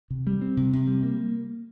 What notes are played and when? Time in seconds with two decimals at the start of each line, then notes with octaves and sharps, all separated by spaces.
0.10 C3
0.27 G3
0.41 C4
0.57 C3
0.73 C3
0.87 G3
1.03 A#3